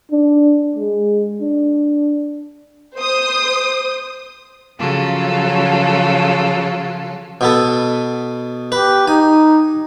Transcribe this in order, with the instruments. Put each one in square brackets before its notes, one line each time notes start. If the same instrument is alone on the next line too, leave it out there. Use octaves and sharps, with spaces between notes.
[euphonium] D4
G#3
D4
[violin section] C5 D#6
[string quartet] C#3 F3 F#3 F4 A4
[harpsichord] B2 B3 A4
[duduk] G4 [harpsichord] B4
[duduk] D#4 [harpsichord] G#5